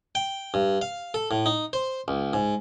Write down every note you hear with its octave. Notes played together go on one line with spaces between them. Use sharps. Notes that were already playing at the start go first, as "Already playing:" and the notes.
G5
G2
F5
A4
A2
D#4
C5
C#2
G#2